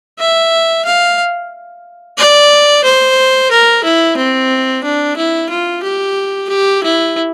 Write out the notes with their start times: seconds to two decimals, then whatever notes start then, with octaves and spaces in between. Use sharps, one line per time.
0.20 E5
0.85 F5
2.18 D5
2.84 C5
3.51 A#4
3.84 E4
4.17 C4
4.84 D4
5.16 E4
5.50 F4
5.83 G4
6.49 G4
6.83 E4